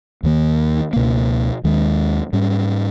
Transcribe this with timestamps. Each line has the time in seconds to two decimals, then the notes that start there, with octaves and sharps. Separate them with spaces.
0.23 D#2 D#3 A#3
0.93 C#2 B2 A#3
1.64 D#2 D#3 G#3
2.33 G#2 G3 C#4